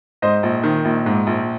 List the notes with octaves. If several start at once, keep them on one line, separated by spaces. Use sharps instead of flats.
G#2 C5 D#5
A#1
D#3
A#1
G#2
A#1